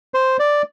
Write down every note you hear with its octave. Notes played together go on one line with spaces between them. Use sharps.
C5
D5